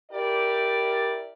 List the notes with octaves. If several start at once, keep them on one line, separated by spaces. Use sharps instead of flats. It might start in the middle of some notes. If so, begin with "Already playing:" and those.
E4 G4 A#4 D5